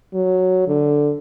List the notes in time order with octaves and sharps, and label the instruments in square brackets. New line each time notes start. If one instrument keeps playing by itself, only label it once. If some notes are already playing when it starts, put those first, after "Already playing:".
[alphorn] F#3
D3